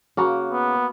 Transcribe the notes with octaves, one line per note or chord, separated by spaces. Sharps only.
C#3 A#3 F#4 A#4
B3